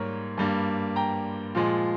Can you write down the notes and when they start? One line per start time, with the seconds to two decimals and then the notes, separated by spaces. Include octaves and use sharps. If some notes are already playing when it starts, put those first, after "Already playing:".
Already playing: G#2 G3 A#3 A#4 C#5
0.38 G2 G3 A#3
0.96 G5 A#5
1.55 A#2 F3 G#3